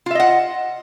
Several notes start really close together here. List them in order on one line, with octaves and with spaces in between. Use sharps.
F4 E5 D#5 F#5